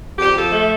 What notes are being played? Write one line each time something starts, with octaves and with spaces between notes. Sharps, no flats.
F2 G4
F3 A4
A3